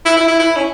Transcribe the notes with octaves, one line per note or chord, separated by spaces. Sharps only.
E4
E4
E4
E4
C#4